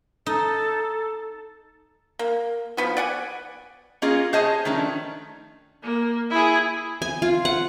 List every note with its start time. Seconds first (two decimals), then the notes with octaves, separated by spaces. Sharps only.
0.26 D#4 A4
2.19 A#3
2.77 F3 B3 F#4
2.97 D5 F#5 G#5
4.02 A#3 C#4 F4 G#4 D#5
4.33 G#4 C5 C#5 D#5 G#5 A5
4.65 D#3 F3 A3 C#4 D4
5.83 A#3
6.30 E4 G#4
7.02 G#5
7.22 F4
7.45 F#5